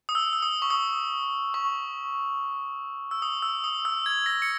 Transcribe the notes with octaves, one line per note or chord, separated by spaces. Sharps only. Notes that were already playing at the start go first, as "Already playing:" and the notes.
D#6
E6
E6
D#6
C#6
D#6
C#6
E6
D#6
E6
D#6
E6
G#6
A#6
C#7